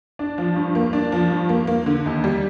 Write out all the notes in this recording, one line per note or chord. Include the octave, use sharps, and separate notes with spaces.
D4
F3
G2
A#3
D4
F3
G2
A#3
A#3
D3
D#2
G3